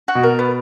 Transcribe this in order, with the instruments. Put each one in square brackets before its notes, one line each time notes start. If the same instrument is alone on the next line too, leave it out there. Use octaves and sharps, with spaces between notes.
[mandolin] F#4
[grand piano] B2
[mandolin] A#4
B3